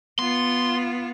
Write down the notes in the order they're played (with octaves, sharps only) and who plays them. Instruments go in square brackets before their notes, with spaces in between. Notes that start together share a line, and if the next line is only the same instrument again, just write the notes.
[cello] B3 F4 [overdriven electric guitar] C6